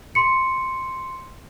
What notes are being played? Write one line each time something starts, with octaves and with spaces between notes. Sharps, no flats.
C6 C#7